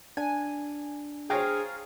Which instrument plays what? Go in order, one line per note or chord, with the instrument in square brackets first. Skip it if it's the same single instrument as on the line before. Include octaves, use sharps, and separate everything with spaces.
[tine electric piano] D4 [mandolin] G#5
[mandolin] F4 F5 A#5 [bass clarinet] G#4 [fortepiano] C5 C#5 G5